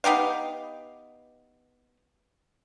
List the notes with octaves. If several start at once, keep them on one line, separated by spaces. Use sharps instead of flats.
B3 D#4 G4 F5